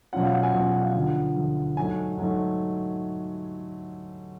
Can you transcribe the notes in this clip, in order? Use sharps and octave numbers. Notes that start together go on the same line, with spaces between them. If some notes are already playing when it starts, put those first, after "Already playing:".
B2 F#3 C#4 F4 F#5
F5
F#5
G#5
B2 F#3 C#4 F4
F5
D2 D3 F3 F#5
D2 D3 F3
G#2 F#3 A3 G#5
G#2 F#3 A3